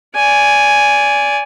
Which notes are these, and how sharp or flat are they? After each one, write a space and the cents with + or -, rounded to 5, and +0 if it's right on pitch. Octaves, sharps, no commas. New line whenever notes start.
D5 -25 G#5 +0